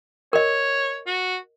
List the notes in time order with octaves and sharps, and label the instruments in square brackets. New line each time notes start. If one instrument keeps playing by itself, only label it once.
[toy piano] A#4 D#5 [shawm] C#5
[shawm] F#4